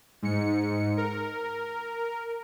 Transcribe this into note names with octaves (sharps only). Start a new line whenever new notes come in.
G#2 C#7
A#4